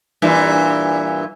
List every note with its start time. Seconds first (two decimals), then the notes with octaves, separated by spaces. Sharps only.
0.22 G2 A#2 E3